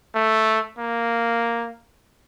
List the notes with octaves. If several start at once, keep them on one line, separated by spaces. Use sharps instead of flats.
A3
A#3